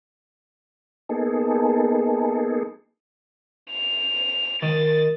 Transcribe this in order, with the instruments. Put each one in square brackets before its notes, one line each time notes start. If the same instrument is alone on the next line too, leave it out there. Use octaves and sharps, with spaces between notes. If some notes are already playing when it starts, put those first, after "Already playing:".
[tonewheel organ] A#3 B3 D#4 G#4 A4
[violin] F7
[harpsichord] D#3 [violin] A6